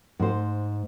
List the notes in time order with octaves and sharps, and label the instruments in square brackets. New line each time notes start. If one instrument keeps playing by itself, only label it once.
[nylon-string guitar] G#2 C5